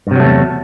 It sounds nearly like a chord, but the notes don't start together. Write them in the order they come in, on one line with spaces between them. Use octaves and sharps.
G2 C3 F#3 A3 E2